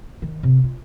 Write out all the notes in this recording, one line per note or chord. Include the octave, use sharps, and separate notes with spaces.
D#3
C3
F4